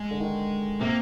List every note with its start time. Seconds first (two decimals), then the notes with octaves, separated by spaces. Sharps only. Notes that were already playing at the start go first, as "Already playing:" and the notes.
Already playing: G#3
0.11 D3
0.20 D#3
0.80 C3 A#3